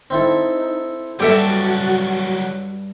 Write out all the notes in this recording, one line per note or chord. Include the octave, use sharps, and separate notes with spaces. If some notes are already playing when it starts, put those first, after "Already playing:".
C4 D#4 E4 A4
G2 F#3 D4 F#4 G4 A4 E5